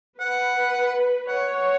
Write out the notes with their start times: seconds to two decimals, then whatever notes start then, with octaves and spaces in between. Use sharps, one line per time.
0.20 B4 F#5
1.28 C#5 F#5
1.55 F#5